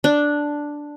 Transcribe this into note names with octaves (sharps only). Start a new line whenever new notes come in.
D4